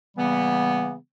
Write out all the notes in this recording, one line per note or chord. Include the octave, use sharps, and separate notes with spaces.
C#3 E3 G3 A#3 B3